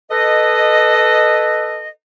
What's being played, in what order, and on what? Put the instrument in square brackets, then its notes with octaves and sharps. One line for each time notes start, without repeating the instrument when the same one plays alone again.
[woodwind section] A4 B4 D#5